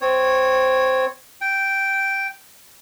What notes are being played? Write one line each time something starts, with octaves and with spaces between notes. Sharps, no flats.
C4 C#5
G5